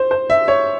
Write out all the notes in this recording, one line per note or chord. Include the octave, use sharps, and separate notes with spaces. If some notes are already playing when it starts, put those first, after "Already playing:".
Already playing: C5
C5
E5
C#5